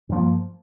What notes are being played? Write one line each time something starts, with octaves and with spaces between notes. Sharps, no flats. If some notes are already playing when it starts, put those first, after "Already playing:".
G2 F3 A#3